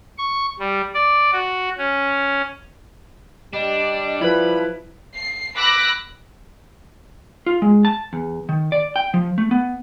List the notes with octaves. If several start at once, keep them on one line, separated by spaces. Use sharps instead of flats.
C#6
G3
D5
F#4
C#4
G3 D4 D#5
F3 E4 B4 B5
C7
B5 D6 E6 F#6 A#6
F4
G#3
A5
E2
D#3
D5
G5
F3
A3
B3